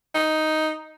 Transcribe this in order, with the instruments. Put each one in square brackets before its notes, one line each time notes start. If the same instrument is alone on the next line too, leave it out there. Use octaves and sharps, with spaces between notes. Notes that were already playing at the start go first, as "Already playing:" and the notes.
[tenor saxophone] D#4